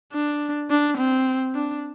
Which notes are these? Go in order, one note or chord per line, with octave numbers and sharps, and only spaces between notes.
D4
D4
C4
D4